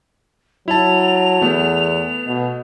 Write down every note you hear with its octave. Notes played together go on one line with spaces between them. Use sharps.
F#3 E4 A5 F7
E2 A3 B3
B2